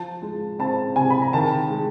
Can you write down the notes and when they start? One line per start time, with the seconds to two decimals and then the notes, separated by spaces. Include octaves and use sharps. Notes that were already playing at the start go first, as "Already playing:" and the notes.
Already playing: F3 A5
0.22 G#3
0.59 C4 A5
0.96 C3 G#5
1.10 B5
1.22 A#5
1.33 D#3 A5
1.70 G#3